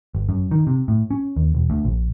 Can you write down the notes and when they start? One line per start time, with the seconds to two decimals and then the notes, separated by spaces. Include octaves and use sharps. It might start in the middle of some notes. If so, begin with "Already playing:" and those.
0.15 G1
0.29 F#2
0.51 D#3
0.67 C3
0.88 A2
1.11 C#4
1.36 D#2
1.55 E1
1.70 D2
1.85 A#1